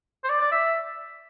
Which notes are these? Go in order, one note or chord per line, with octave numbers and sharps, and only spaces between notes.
C5
D5
D5
E5